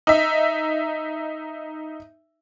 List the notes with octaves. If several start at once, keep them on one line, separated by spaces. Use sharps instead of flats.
D#4 E5